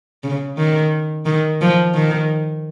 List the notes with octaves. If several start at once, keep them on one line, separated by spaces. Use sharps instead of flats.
C#3
D#3
D#3
F3
D#3